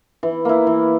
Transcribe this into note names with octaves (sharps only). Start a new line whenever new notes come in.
E3
A#3 E4
E3